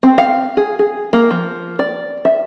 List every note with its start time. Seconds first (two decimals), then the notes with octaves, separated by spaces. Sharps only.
0.03 C4
0.18 F5
0.57 G#4
0.79 G#4
1.13 A#3
1.31 F3
1.79 D5
2.25 E5